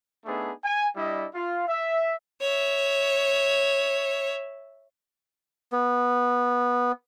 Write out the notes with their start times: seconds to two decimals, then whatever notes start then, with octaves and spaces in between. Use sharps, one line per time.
0.25 A3 B3 D4 D#4 G#4
0.64 G#5
0.96 G3 D4 E4 D#5
1.35 F4 F5
1.68 E5
2.41 C#5 E5
5.72 B3